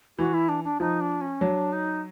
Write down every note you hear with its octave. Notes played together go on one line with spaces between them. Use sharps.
E3 F#4
E4
D4
D4
F3 D#4
D4
C#4
F#3 D4
D#4